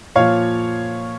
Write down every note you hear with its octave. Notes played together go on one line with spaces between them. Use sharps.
A#2 F3 C#5 F5